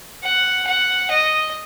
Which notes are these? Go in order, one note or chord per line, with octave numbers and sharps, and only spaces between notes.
F#5
F#5
D#5